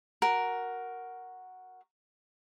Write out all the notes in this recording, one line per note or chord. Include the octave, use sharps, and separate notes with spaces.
F#4 A#4